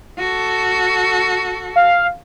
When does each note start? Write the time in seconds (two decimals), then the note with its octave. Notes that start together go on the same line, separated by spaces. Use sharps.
0.19 F#4 A4
1.76 F5